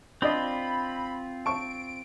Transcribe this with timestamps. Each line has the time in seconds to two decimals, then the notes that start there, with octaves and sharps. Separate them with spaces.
0.22 C4 D4 F4 D5 D#5 B5
1.46 A5 C#6 D7